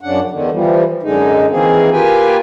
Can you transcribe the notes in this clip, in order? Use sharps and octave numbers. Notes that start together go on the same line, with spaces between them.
F#2 C#3 D4 F#5
E2 D3 D#3
E3 F3 G3
F#2 D3 G#3 D#4
D#3 E3 A#3 C4 G#4
A#3 F4 G4 B4 G5 G#5